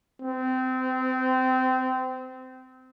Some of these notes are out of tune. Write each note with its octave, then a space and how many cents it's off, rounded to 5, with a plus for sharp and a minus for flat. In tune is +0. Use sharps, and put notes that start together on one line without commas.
C4 -25